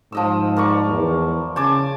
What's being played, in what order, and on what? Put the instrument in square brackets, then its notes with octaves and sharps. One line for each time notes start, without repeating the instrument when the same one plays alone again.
[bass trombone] G#2 [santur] F3 D#5 E6
[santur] A#4 D5 C#6
[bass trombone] E2
[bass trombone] C#3 [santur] G#5 A5 D6